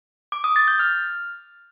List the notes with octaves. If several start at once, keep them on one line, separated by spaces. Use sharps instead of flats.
D6
D#6
A6
G6
F6